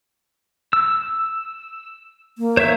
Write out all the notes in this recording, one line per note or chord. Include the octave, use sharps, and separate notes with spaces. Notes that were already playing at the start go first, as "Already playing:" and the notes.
E6
A#3
C5 C#5 E5